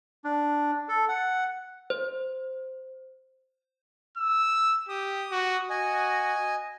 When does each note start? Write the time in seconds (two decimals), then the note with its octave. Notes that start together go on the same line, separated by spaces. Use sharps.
0.24 D4
0.89 A4
1.09 F#5
1.90 C5
4.18 E6
4.89 G4 D#6
5.31 F#4
5.70 F#4 D#5 G#5